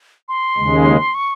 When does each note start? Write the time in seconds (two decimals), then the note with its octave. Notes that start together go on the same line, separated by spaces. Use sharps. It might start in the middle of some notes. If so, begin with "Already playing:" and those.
0.29 C6
0.57 D#2 C#3 G#3
1.15 C#6